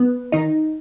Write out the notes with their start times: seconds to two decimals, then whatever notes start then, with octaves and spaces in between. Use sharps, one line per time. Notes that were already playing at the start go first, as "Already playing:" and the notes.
Already playing: B3
0.32 D#3 D#4